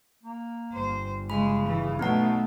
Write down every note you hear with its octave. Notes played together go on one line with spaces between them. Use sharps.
A#3
G1 C5
C#3 G#3 B5
E3
B2 F#3 A3 B3 D#4 F#5